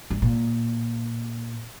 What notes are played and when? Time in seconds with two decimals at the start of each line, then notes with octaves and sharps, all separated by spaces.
0.11 G2
0.22 A#2